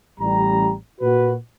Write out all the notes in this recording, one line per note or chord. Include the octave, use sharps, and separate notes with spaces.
A1 G3 A#5
A#2 F#4 B4